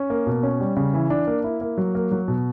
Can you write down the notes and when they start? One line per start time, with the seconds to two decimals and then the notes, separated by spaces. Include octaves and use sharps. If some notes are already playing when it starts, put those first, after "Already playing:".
Already playing: C#4
0.10 A#3
0.26 B2
0.43 C#4
0.60 G3
0.76 C#3
0.94 E3
1.10 D4
1.27 A#3
1.44 E4
1.61 A#3
1.78 F#3
1.95 A#3
2.11 F#3
2.28 B2